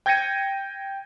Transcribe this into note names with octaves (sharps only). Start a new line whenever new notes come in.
G5 G6 G#6 A#6 C#7 D#7